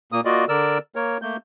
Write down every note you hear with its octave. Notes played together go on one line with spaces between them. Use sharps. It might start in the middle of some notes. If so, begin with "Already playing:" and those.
A#2 A#3 D#6
A#3 F4 F#4 D5 D#5
D3 A#4 D5 E6
A#3 A#4 C#5
A3 A#3 G6